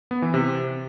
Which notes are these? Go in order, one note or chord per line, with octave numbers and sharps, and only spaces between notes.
B3
E3
C3